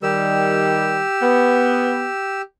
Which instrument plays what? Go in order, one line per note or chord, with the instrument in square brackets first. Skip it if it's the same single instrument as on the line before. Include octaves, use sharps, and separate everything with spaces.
[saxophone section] D#3 G3 [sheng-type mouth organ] G4 E6
[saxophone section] B3